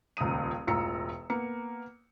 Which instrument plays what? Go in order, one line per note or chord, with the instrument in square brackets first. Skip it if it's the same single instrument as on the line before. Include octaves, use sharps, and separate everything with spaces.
[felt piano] D#1 C#2 A#5 D#6 D#7
E1 A1 F4 A#5 E6 C#7
A#3 B3 C#7